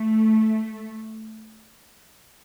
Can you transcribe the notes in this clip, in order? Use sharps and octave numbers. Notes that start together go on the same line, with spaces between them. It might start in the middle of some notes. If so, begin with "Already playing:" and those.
Already playing: A3